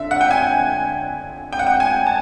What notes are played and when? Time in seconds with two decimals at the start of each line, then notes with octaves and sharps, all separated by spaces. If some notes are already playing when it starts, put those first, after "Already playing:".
Already playing: D3 E5
0.11 F#5
0.21 G5
0.31 G#5
1.53 G5
1.59 F#5
1.67 G5
1.80 G#5
2.07 A5